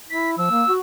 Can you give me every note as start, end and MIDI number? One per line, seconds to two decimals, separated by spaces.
0.10 0.37 64
0.10 0.31 95
0.38 0.46 53
0.38 0.73 88
0.51 0.64 58
0.69 0.79 66